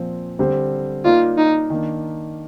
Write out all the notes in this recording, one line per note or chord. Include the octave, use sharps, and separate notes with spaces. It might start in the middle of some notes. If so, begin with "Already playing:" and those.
Already playing: A#2 F3 C4
D3 G3 C4 G4 C5
A#3 D#4 F4 A#4 D5
D#4
D#3 A#3 D4